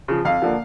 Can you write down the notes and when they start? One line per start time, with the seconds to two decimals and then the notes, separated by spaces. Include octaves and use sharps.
0.08 C#3 F3
0.25 F2 F5
0.42 D3 F3 A#3